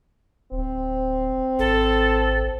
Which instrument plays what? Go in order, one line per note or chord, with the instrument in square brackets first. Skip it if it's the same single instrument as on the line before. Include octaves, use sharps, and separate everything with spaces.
[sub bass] D1 [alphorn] C4
[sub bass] G#1 [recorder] A4